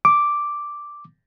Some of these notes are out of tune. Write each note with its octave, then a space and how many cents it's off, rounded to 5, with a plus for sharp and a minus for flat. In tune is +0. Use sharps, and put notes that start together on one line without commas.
D6 +0